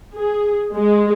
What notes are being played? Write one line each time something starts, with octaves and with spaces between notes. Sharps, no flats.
G#4
G#3